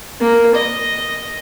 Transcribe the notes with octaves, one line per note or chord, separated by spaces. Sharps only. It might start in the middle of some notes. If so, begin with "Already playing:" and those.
A#3
D#5